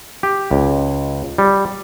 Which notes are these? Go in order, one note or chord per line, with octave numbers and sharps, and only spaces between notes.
G4
C#2
G3